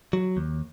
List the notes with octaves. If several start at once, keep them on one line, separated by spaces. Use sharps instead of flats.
F#3
D#2